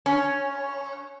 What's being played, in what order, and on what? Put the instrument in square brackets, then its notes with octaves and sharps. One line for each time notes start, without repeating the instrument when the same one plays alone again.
[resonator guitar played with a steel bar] C#4